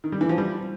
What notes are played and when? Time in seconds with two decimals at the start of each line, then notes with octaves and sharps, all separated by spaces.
0.04 D#3
0.12 G3
0.21 E3
0.29 F3
0.38 G3